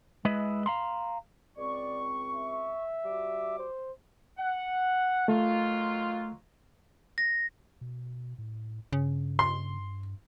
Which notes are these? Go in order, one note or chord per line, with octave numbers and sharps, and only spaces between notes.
G#3 E4 B4 D#5
F5 A#5 C6
C#2 C4 D5 C#6
E5
G3 F#4 D6
C5
F#5
D#3 F#3 A3 F4
A#6
B2
A2
G2 C#3
C6